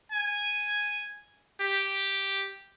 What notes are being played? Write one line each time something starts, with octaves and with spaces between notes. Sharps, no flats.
G#5
G4